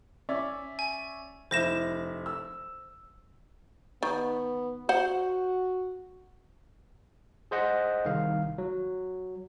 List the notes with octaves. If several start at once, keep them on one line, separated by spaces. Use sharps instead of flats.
C#4 D5 E5
G#5
F1 E4 C5 A#6 E7
E6
D#3 B3
F#4 C5 F#5
G#4 C5 D#5 F#5
C2 D#3 F5
F#3